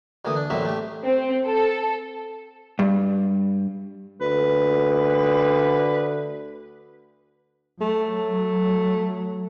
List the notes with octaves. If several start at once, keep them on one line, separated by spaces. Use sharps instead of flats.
D2 E3 A#3 D#6
D4
A1 F#3 A#3 C4 E5
A3 G4
C4
A4
G2
D2 B4
F#3 A3